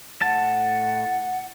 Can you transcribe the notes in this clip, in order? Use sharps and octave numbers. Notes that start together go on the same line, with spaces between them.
A2 F#5 A5